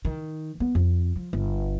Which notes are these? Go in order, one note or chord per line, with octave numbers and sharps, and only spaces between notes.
D#3
B3
F2
F3
G1